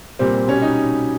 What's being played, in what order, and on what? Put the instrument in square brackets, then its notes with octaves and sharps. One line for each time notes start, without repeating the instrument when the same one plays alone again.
[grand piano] A#2 G3 C4
B2 G3 C#4
D#4